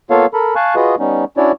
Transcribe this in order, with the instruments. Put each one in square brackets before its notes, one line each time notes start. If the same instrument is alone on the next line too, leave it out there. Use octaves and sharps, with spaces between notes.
[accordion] A#3 B3 F4 A4 C#5 F5
A4 A#4 B5
F5 G#5 A5 C#6 F#6
F4 F#4 G#4 B4 D#5
G3 B3 C#4 D#4
C#4 D4 E4 F#4 C#5 D5